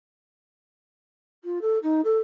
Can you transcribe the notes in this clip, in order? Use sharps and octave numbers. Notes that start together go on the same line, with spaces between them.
F4
A4
D#4
A4